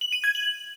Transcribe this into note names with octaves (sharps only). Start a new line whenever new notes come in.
F#7
D#7
G#6
F#7